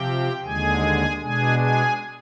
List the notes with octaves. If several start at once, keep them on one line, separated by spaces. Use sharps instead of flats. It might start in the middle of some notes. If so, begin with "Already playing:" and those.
Already playing: C3 F3 C4 G4 G5
D#2 D3 G#3 G#4 G#5
B2 G#3 D4 G#4 G#5
G#4 G#5